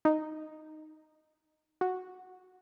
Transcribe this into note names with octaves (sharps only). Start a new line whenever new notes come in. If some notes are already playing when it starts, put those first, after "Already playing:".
D#4
F#4